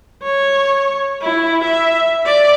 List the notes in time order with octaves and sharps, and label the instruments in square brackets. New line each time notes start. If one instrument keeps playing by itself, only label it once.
[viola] C#5
E4
E5
D5